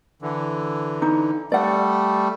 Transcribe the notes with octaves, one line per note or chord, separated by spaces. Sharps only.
D3 E3
D#4
G3 A3 D5 F#5